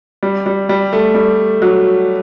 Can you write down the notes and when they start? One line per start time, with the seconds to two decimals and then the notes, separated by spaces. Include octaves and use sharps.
0.23 G3
0.46 G3
0.69 G3
0.93 A3
1.15 G3
1.62 F#3